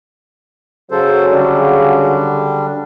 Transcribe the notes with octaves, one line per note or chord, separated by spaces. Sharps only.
C#3 F#3 A4 C5
D3 G3 D4